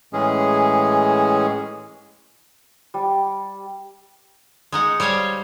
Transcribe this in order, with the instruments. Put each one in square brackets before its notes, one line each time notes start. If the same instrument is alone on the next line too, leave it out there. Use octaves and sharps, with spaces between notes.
[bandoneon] A2 E3 G#3 C#4 G#4
[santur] G3
[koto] G#3 D#4 F#5
G3 C5 C#5 F5 G#5